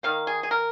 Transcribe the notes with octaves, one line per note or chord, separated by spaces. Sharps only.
D#3 A#3 F5
G#4
G#4
A#4